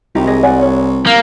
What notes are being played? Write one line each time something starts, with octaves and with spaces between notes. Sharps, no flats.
C2 D#4 F4 G4
G#4 D#5
D5 F#5 G#5
C#5
A#3